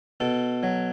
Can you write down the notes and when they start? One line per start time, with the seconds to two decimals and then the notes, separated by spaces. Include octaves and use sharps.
0.20 B2 A4
0.63 F#3